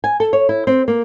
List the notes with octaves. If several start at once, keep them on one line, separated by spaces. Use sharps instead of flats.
G#5
A4
C#5
E4
C4
A#3